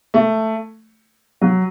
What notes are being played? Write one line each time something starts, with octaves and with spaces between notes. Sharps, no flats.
A3
F#3